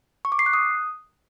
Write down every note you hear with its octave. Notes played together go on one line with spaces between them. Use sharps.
C#6
D6
C7
F#6
D#6